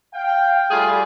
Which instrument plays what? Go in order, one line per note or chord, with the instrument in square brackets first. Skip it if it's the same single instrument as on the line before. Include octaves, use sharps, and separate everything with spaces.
[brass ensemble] F5 G5
[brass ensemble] G3 [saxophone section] A3 F4 G#4